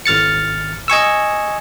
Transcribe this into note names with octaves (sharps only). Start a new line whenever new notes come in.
G#1 F6 A6 C#7
D#5 G#5 C#6 E6